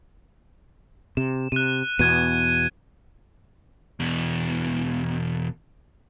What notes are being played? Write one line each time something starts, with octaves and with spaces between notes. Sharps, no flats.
C3 E7
C3 F#6 D#7
E2 B2 F#6 G#6 D#7
E2 B2